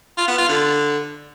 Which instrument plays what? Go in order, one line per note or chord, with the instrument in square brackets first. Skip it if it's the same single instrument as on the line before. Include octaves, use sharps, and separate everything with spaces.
[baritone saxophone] F4
B3
F4
D3